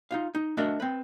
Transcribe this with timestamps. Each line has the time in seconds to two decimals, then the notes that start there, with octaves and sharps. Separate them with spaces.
0.11 D#4 F4 F5
0.35 D#4
0.57 A3 D4 F#4 A#4 D#5 E5
0.80 C4 B4